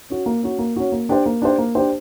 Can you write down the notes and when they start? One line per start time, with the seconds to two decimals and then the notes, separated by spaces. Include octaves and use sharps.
0.10 C#4 F#4
0.26 A#3
0.43 C#4 F#4
0.59 A#3
0.76 C#4 F#4
0.92 A#3
1.09 D4 G4 C5
1.26 A#3
1.42 D4 G4 C5
1.58 A#3
1.75 D4 G4 C5